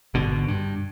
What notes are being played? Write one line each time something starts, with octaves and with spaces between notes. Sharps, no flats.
G#1 B2 D3
G2